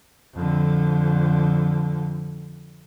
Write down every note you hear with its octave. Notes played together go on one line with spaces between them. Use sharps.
F2 D3